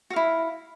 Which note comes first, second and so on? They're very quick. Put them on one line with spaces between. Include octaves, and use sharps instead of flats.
F#4 F5 E4